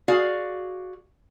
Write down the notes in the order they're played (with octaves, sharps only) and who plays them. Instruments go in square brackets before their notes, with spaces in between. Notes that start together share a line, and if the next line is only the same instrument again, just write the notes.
[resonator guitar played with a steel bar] F#4 G#4 D5 F5